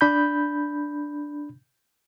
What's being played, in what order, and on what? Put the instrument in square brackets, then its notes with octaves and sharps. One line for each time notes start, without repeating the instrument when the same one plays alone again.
[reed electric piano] D4 B5 G6